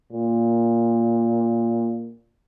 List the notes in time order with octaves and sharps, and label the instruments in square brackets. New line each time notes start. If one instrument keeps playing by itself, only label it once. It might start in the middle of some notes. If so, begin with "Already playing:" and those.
[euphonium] A#2